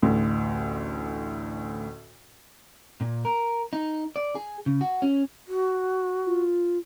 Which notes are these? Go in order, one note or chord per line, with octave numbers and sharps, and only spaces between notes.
A1 D2 A2
A#2
A#4
D#4
D5
G#4
C#3
F#4
C#4
F#4
F4